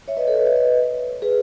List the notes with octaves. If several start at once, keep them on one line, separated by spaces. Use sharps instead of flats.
C#5 E5
B4 D#5
A4 C#5
B4 D#5
C#5 E5
B4 D#5
G#4 B4